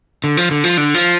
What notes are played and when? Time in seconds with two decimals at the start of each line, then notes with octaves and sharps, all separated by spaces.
0.24 D3
0.37 F3
0.51 D3
0.64 F3
0.77 D3
0.94 F3